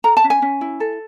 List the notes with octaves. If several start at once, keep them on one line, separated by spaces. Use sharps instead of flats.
A4 A#5
A5
C#4
G#5
C#4
E4
A4